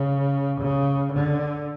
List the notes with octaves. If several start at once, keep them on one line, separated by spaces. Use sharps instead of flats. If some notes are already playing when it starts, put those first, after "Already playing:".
Already playing: C#3
C#3
D3